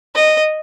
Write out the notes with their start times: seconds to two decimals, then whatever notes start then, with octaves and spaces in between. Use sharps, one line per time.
0.15 D#5